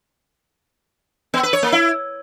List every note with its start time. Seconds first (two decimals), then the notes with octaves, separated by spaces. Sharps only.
1.34 B3
1.43 B4
1.53 C#5
1.63 A#3
1.72 E4